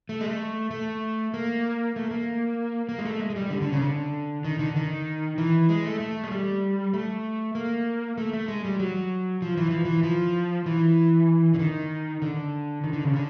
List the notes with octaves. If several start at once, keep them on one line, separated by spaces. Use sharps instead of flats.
A3
G#3
A3
A3
A#3
A3
A#3
A#3
G#3
A3
G#3
G#3
G3
D3
D3
C#3
D3
D#3
D3
D#3
E3
G#3
A3
A3
G#3
G3
A3
A#3
A3
A3
G#3
G3
F#3
F3
E3
F3
E3
F3
E3
D3
D#3
D3
D#3
D3
C#3
D3